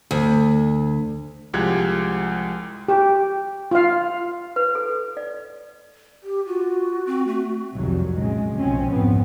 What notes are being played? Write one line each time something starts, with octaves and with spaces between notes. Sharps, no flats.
D2
C2 F3 G#3 G4 F#6 G#6
G4
F4 F5
B4
A4
D5
G4
F4 F#4
C4
A3
F1 C2 F2 D#3 F#3 G3
A#2 C#3 G#3
B1 C#3 F3 C4 C#4
C2 F2 G#2 F3 B3 C4